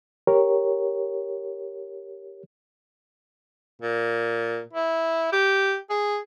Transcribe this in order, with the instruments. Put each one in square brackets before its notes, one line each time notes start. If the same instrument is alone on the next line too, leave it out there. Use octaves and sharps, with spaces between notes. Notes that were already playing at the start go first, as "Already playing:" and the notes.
[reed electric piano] G4 A#4 C#5
[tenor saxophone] A#2
E4
G4
G#4